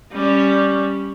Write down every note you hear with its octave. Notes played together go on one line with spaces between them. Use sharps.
G3 C#4